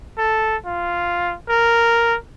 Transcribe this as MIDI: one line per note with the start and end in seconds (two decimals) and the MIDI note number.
0.18 0.56 69
0.66 1.34 65
1.49 2.17 70